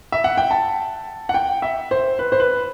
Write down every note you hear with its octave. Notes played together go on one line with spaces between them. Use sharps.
E5
F#5
G5
A5
F#5
G5
E5
C5
B4
C5
B4